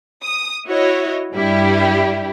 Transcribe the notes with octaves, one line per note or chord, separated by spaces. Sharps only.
D#6
E4 F#4 C#5 D#5
G2 G3 E4 G4